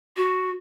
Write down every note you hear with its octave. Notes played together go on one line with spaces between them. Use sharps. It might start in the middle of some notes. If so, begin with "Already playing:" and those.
F#4